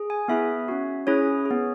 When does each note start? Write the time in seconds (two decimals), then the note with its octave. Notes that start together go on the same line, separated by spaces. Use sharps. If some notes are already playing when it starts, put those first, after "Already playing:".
Already playing: G#4
0.10 G#5
0.28 B3 E4 G#4 E5
0.68 C#4 F#4
1.07 C#4 E4 G#4 C#5
1.46 G#4
1.51 B3